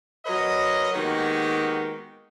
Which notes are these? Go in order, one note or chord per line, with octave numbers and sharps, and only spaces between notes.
F#3 A#4 B4 C#5 D#5
D#3 G#3 A#3 B3 F#4 G4